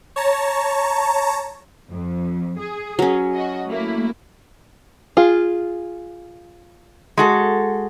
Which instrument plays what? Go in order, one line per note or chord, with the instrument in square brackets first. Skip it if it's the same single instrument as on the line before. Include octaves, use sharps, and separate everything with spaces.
[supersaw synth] C#5 A5 A#5
[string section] F2
G#4
[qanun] F#3 C#4
[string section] F#4 D#5
A3 A#3 E4
[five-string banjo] F4 G#4
[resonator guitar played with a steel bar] G#3 F#4 A4